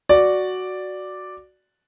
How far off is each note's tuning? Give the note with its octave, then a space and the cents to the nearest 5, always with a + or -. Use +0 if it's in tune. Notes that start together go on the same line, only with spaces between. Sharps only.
F#4 +0 D5 +0